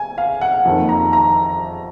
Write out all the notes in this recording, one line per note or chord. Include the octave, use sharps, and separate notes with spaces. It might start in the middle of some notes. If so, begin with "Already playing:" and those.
Already playing: G#5
F5
F#5
F2 D#3 A#3
A#5
A#5